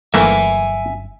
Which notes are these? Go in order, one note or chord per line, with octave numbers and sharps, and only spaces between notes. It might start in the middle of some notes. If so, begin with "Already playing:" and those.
G1 E3 F#3 A3 A#3 E5 G#5